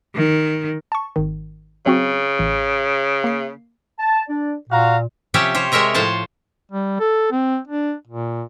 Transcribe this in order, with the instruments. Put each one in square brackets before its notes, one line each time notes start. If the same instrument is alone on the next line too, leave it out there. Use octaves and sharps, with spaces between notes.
[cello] D#3
[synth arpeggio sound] A5 C#6
G#1 D#3
[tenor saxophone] C#3 [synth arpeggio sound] F#3 C4 F#4
[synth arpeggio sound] A1
A#3 C7
[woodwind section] A5
D4 D5
[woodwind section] A#2 [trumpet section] F#4 F5 A#5
[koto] C3 F3 C#4 G4 C#5 E5
G4 C5 C#5
C3 G#3 A#4 C#5 E5 A#5
A2 F3 C5 C#5 A5
[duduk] G3
A4
C4
D4
A#2